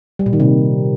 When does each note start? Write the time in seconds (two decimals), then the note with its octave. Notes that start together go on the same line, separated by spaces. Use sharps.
0.19 G3
0.26 A#2
0.33 D#3
0.40 C3